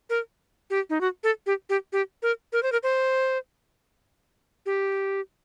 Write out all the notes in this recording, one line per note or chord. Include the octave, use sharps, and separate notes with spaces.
A#4
G4
D#4
F#4
A4
G4
G4
G4
A#4
A#4
C5
A#4
C5
G4